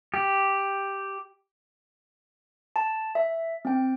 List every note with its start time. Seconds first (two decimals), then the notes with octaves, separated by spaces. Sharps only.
0.14 G4
2.76 A5
3.15 E5
3.65 C4 G5